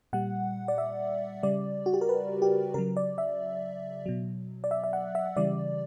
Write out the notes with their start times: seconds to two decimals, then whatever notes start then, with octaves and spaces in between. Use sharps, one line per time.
0.13 A#2 G3 F#5
0.68 D5
0.78 E5
1.43 C#3 G3 D5
1.86 F#4
1.94 G4
2.01 A#4
2.09 B4
2.42 G4
2.74 C#3 F#3 A#4
2.97 D5
3.18 E5
4.06 B2 F#3
4.64 D5
4.71 E5
4.84 E5
4.93 F#5
5.15 E5
5.36 C#3 E3 G3 D5